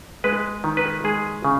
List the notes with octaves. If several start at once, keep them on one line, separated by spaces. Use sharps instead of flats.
G#3 B4
D#3
B4
G#3 G#4
C#3